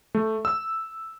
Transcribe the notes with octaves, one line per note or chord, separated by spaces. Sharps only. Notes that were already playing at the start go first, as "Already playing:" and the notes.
A3
E6